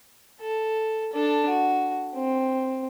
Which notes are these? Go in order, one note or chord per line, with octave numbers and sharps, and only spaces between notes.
A4
D4 A4
F#4
C4